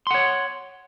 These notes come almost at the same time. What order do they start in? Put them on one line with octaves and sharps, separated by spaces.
C6 F#5 C#5